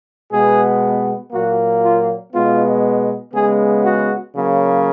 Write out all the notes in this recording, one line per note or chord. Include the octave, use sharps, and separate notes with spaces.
B2 G#3 B3 G#4
A#2 F#3 A#3 F#4
F4
B2 G#3 B3 F4
C#3 G#3 B3 G#4
F#4
C#3 F#3 A#3